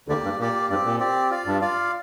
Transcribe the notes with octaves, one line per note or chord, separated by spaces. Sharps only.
D2 D3 A#3 G4 D5
G2
A#2 A#3 G4 D5
G2 C4 G4 D5
A#2
C4 G4 D5
F4 D5 F5
G2
F4 D5 F5